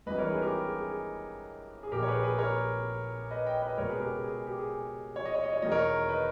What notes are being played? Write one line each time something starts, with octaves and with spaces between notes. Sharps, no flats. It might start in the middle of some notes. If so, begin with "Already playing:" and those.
G#1 G2 E3 B4 D#5
A#4 C#5
G#4 B4
G4 A#4
G4
G#4
G#4
G#4
G#4
A#1 A#2 G4 A#4
C#5
G#4 B4
G#4 B4
A#4 C#5
B4 D#5
D#5 G5
B4 D#5
C#2 B2 A#4 C#5
G#4 B4
G4 A#4
G#4
G#4
G4
G#4
C#5
D#5
C#5
D#5
C#5
E1 E2 D#3 D#5
A#4 C#5
B4 D#5